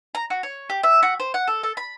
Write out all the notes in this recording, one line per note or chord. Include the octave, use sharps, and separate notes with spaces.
A#5
F#4
C#5
G4
E5
F#4
C5
F#5
A4
A4
B5